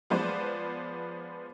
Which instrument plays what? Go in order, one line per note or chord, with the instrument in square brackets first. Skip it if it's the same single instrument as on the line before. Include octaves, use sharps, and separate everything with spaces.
[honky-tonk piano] F3 G#3 B3 B4 C5 D5